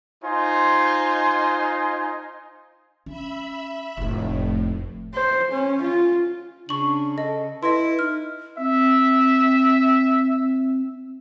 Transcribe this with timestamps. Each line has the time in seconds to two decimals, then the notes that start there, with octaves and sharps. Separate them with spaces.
0.24 D#4 F4 C5 G#5 C6
3.06 C#4 E5 B5 E6
3.97 F1 A2 A3
5.14 C5
5.52 C#4
5.82 F4
6.69 C#3 D4 C#6 F#7
7.18 A4 D#5
7.63 E4 B4 D#5 C6
7.99 D#4 F6
8.58 C4 E5